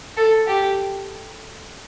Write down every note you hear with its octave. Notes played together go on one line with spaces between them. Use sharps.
A4
G4